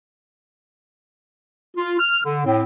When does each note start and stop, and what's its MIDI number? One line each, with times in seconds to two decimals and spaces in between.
1.76 1.99 65
1.99 2.20 89
2.24 2.43 50
2.45 2.64 45
2.45 2.64 60